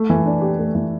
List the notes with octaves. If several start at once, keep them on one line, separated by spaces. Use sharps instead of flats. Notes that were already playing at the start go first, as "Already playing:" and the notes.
Already playing: A3
E3
D4
G4
A3
E3